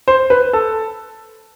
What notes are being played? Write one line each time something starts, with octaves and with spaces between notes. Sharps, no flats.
C5
B4
A4